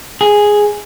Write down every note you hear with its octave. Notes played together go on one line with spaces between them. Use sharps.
G#4